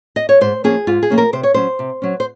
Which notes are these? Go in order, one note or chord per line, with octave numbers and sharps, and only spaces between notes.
D#5
C#5
G#2 C5
F3 A#3 C#4 G#4
G#2 F4
G#4
F3 A#3 C#4
A#4
C3 C5
C#5
F#3 C#4 C5
C3
F#3 C#4
C5